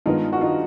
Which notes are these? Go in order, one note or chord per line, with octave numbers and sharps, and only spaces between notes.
G2 D#3 G#3 B3 D#4 F4
F#4
D#4 F4